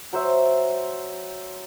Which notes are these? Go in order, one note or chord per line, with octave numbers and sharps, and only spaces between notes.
F#3 C5 E5